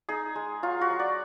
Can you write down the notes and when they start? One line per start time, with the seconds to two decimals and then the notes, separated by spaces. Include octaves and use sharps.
0.09 D#4 G#4
0.35 G#3
0.63 F#3 F4
0.81 F#4
0.90 F#3
0.99 D5